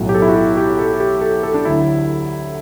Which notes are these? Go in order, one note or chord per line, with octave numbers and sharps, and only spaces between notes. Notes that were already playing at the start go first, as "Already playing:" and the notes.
Already playing: B1 A2 F#3
G4
A4
E4
F#4
G4
G4
A4
G4
A4
A4
D4
D2 D3 F#3 E4